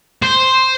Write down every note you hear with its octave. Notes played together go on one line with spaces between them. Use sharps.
C5